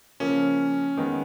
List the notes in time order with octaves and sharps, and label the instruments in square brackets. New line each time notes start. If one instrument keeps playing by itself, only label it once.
[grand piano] C#3 F3 A#3 [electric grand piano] C#4
[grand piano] D#3 G#3 B3